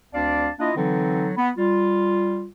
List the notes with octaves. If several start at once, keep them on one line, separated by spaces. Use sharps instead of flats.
D2 C4 D4 D5 F5 A5
A#3 D4 E4 F4 D#5
D3 E3 F#3 C4 D#4 A4
B3
G3 F4